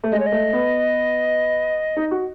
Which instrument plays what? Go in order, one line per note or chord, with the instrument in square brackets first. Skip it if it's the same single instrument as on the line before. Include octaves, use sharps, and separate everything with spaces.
[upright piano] A3
[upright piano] G#3 [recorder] D#5
[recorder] C#5
D#5
[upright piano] A3
B3
D#4
F#4